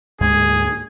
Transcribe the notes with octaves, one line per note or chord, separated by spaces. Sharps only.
D2 G#2 G#3 A#3 G#4 G#6